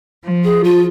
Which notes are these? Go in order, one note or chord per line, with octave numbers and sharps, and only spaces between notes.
F3
G#4
F4